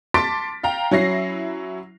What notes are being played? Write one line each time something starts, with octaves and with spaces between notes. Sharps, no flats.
A5 C6 D6 A6 B6 D7
F5 G5 A#5
F#3 C#4 E4 A#6 C7